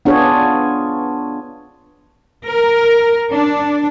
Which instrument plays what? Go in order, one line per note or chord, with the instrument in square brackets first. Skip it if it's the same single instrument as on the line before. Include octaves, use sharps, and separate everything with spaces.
[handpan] B3 D4 F4 G#4 C#5
[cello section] A#4
D4